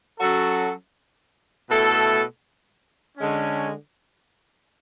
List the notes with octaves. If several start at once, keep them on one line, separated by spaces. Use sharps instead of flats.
F#3 C#4 F#4 A4
B2 A3 E4 A4
D3 G#3 C#4